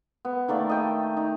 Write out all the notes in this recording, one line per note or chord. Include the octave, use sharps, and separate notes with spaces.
B3
D#3 A3 A#3 D5
D#5 G5 A5
D#4